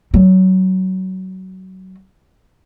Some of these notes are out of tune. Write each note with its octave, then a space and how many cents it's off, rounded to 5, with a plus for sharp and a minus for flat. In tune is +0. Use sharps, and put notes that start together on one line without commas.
F#3 +20